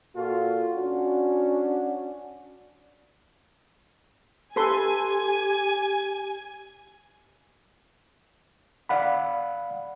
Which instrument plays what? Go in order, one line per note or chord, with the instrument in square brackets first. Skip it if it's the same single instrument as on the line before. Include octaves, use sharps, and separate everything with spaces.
[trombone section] A#2 F4 F#4 A4
C#4 D4 F#4
[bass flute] G4 [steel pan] A4 B4 C6 [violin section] G#5
[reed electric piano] D5 F5 F#5 B5